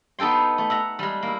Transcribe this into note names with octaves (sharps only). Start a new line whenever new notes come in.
B3 D#4 A4 G5 C6
A3
E5 F#5 A#5
G3 G#3
A#3 E4